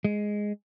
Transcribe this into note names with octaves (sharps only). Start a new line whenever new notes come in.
G#3